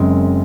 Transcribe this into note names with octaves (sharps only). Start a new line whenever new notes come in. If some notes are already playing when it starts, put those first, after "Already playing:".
Already playing: F#1 F#2 C#3 G#3 C4